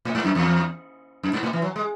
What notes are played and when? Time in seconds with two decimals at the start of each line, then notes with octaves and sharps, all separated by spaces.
0.05 A2
0.15 G#2
0.25 F#2
0.35 E2
1.23 F#2
1.33 G#2
1.43 A2
1.53 E3
1.62 F#3
1.76 G#3